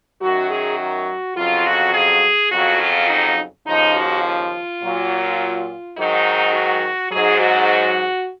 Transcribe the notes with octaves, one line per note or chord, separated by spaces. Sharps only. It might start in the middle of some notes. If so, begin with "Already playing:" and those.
F#2 D#3 F#3 F#4
G#4
F#4
F2 C#3 F#3 F4
F#4
G#4
F2 C#3 F#3 F#4
F4
D#4
D#2 C#3 F3 D#4
F#4
F4
A#2 F#3
G#2 D#3 F#3 D#4
F#4
G#2 F#3 G#4
F#4